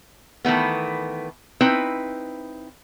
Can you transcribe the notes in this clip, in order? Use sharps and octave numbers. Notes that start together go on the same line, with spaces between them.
D#3 E3 A3 B3
C4 D#4 E4 B4